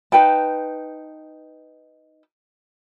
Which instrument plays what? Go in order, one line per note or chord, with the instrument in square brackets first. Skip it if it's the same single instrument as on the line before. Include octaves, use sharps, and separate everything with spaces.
[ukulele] D#4 B4 G5 A5